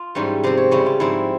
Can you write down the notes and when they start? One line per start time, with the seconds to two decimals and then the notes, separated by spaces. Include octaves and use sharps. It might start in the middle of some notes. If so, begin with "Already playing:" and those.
Already playing: F4
0.15 G#2 E3 G3 C#4
0.43 C3 F3 C4 C5
0.57 C#5
0.71 C#3 G3 C#4 E4
0.86 F4
1.00 G#2 F3 C4 E4